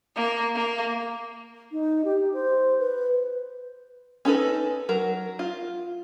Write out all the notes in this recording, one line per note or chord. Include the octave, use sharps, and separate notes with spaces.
A#3
A#3
D#4
G4
C5
B4
C#4 D#4 A4 B4
F#3 A#4
F4